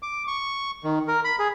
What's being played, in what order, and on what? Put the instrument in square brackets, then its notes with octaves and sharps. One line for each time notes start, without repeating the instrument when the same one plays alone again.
[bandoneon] D6
C#6
D#3
A#4
B5
G#4